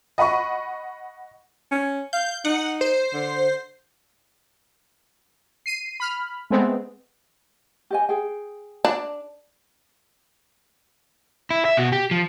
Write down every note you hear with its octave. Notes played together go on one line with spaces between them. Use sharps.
D#5 F#5 B5 C#6
C#4
F5 G6
D#4 F#5
C5
D3
C7 D#7
B5 F6
G#3 A3 B3 C4
G4 D#5 G#5
G#4 G5
D4
E4
E5
B2 F#4
G4
F3